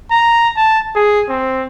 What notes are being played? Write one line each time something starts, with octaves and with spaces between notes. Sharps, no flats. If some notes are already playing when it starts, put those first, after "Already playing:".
A#5
A5
G#4
C4